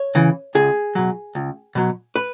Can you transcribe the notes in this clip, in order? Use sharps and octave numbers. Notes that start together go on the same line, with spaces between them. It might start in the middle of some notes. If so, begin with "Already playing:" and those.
Already playing: C#5
C#3 E3
C#2 G#4
B2 F#3
C#2
B2 F#3
B4